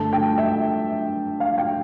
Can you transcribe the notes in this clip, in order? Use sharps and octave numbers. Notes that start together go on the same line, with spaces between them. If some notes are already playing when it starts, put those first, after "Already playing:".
Already playing: G2 D3 A3 A5
G5
E5
F5
G5